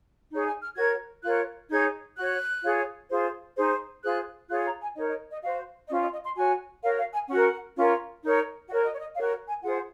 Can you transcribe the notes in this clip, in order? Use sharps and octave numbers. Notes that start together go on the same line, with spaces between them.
D#4 G#4 C#5
G#5
F6
F#4 A#4 C#5 G#6
F4 A#4 C#5 F#6
D#4 G#4 C#5 G#6
F#4 C#5 F#6
F4 G#4 C#5
F4 G#4 C5
D#4 G#4 C5
F4 G#4 C5 F#6
F4 G#4 C#5 F#6
A#5
G#5
D#4 A#4 C#5 D#5
D#5
D#5
F#4 C5 F5
C#4 F4 C5 D#5
D#5
D#5
C6
F#4 C#5 G#5
F#4 A#4 C#5 F5
F5
G#5
C#4 F#4 A#4 F#5
C#4 F4 A#4 C#5
D#4 A#4 C#5
F#4 A#4 C#5 F#5
D#5
C#5
D#5
F#4 A#4 C#5 F5
G#5
F4 G#4 C5 F#5